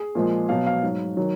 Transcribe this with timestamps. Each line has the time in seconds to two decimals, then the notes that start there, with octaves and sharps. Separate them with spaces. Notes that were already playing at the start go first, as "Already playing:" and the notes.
Already playing: G#4
0.15 A#2 F3 G#3
0.49 B2 F#3 F5
0.66 F5
0.83 G#2 F#3
1.17 D#3 F#3